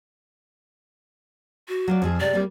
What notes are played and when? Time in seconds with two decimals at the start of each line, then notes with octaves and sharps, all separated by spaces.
1.68 F#4
1.88 F#3 F4 D5
2.02 F2 F3 G#4
2.20 C3 G#3 D5
2.33 G3 A#3 C4